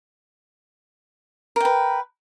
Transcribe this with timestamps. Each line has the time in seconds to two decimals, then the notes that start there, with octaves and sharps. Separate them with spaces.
1.56 A#4
1.60 G5
1.65 B4